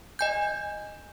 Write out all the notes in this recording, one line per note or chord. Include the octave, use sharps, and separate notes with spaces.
D#5 G#5 G6